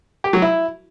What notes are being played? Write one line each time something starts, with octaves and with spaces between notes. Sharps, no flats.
G4
F#3
E4